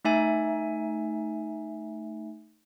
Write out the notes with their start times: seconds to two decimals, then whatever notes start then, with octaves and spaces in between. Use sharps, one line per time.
0.05 A3 D#4 E5 G#5